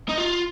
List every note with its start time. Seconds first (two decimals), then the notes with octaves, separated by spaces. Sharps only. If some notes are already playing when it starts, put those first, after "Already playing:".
0.09 D#4
0.18 F4